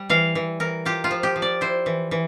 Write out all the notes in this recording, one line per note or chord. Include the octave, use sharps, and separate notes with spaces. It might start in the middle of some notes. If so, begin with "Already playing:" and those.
Already playing: G3
E3 F5
E3
E3 A#4
F4 G4
F4
F3
G4
F3
D5
E4 C5
E3
E3